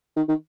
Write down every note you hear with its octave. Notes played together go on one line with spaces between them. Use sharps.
D#3
D#3